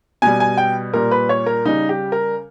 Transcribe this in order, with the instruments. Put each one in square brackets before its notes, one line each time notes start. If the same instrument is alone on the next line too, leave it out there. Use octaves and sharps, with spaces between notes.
[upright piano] B2 G3 G#5
G#5
G5
A#2 G3 A#4
B4
C#5
A#4
C#3 G3 D#4
G4
A#4